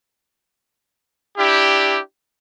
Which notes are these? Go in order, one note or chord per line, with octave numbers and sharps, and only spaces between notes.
D4 E4 G4